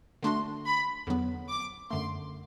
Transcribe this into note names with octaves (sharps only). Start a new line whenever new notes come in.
D3 A3 D4 F#4 C6
B5
E2 D3 F#3 B3
D6
F#2 D3 A3 C6